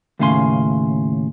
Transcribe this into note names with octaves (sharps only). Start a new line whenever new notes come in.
D#2 A2 C#3 F5 G#5 C6